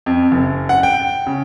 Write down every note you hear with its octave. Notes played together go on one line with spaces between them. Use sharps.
F2
F#1
F#5
G5
C#3